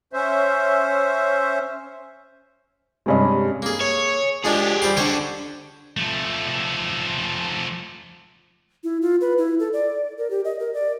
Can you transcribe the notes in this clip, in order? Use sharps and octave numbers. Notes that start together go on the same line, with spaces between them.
C#4 C5 E5
G2 C3 G#3 C#4 D#5
A#3 G#4
C#5
F3 G#3 D4 G4 G#4
G3 C5 C6
D3 D4 G4 C5 C#5
F3 A3
E4
F4
B4
E4
A4
D5
A#4
G4
D#5
A#4
D5